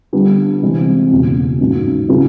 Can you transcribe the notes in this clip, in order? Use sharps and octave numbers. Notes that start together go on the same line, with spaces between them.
D3 G3 B3
C3 E3 G#3 C4
F#1 E2 B2
A1 G#2 D#3 F#3
C#3 F#3 B3 E4 G#4